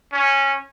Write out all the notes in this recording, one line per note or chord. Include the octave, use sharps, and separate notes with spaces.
C#4